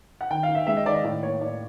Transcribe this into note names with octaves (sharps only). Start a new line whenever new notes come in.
F#5
D#3 G5
F5
D#3
E5
G#3 E5
D#5
D#3 D5
D#5
A2 D5
A#3 C#5
A2 D5